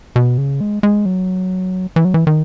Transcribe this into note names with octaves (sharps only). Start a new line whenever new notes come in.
B2
C#3
G#3
G#3
F#3
E3
F#3
E3
D#3